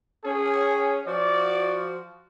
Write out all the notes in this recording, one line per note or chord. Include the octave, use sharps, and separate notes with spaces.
C#4 G#4
F3 F#4 D5